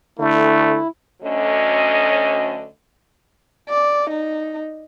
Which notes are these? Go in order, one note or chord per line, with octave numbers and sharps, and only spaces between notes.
D3 A3 E4
D2 D3 F#3 C#4 D#5
D5
D#4